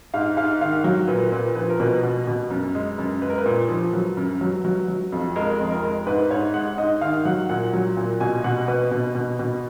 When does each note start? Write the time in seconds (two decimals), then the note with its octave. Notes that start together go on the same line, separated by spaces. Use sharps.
0.14 G#2 F5
0.37 G#2 F5
0.61 D#3 F5
0.84 F#3
1.08 A#2 B4
1.32 A#2 B4
1.55 F3 B4
1.70 A#4
1.80 B2 B4
2.03 B2
2.27 B2
2.50 F#2
2.75 G#3
2.99 F#2
3.22 G#3 B4
3.30 A#4
3.38 B4
3.46 A#2
3.69 F3
3.93 F#3
4.17 F#2
4.41 F#3
4.65 F#3
4.88 F#3
5.12 F2
5.36 G#3 A#4
5.60 F2
5.71 A#4
5.83 G#3
6.06 G#2 B4
6.30 G#2 C#5
6.54 G#3 F#5
6.78 G#2 D#5
7.01 D#3 F5
7.25 F#3 F#5
7.49 A#2 F#5
7.74 F#3
7.97 A#2
8.20 B2 G#5
8.44 B2 F#5
8.68 B2 B4
8.91 B2
9.15 B2
9.39 B2